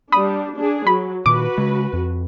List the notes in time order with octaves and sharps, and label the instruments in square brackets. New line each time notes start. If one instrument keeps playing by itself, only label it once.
[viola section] G3 D4 [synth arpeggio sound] B5 D#6
[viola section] D4 G#4
[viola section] F#3 [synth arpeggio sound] B5
[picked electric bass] A#2 D#3 [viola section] F#4 B4 [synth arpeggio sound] D6
[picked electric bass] C#3 G#3
F2